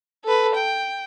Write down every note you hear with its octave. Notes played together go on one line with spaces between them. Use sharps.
A4 B4
G5